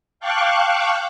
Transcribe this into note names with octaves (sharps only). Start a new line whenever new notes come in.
F5 G5 A5 C#6 D6 F#6